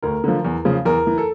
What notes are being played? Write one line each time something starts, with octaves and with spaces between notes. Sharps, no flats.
D2 A#4
D3 F3
E2
C#3 F3
E2 A#4
E3
A4